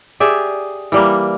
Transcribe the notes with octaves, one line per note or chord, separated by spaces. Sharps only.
G4 G#4 D5 E5
E3 G3 A#3